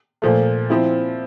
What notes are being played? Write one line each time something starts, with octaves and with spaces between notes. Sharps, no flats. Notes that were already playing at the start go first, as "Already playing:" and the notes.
A#2 F3 A3
F3 C4 E4